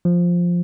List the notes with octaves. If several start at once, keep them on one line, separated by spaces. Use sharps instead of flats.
F3